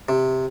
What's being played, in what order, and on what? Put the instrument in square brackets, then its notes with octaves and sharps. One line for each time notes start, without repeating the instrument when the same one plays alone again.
[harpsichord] C3